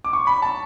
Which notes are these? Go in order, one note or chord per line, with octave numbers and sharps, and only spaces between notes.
D6
C#6
B5
A5